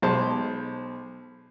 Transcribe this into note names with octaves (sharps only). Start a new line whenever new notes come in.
B1 G#3 C5 A5